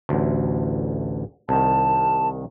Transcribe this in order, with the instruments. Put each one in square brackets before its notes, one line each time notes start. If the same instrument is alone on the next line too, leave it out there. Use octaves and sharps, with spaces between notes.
[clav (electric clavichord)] A1 D2
[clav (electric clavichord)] C2 D#3 [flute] A5